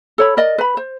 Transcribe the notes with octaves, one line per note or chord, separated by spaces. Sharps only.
A4 C#5 B5
A#4 D5 D#5
B4 B5
C5